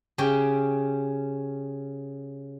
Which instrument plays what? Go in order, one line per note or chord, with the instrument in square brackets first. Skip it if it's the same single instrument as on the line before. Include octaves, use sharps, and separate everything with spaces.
[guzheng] C#3 C#4 G4 G5